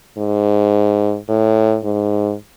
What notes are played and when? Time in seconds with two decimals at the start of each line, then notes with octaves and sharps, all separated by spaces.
0.18 G#2
1.28 A2
1.84 G#2